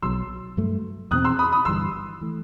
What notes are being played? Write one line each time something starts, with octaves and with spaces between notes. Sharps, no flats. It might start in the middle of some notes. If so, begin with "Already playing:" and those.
B1 B2 F#3 C6 E6
G2 F#3 A3
E2 B2 A3 C4 D#6 F#6
C6 E6
B5 D#6
B5 D#6
G1 G2 E3 G3 C6 E6
E3 A3